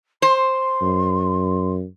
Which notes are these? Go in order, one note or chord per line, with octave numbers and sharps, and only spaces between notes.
C5 C6
F#2